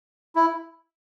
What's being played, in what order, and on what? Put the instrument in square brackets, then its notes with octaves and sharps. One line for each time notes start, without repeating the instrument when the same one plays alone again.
[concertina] E4